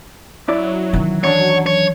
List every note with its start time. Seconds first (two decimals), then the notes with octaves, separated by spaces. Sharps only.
0.48 F#2 F#3 E4 D5
0.93 D#3 E3
1.24 F#2 D4 C#5
1.66 C#5